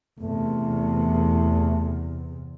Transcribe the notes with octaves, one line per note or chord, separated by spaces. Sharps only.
E2 C3 A3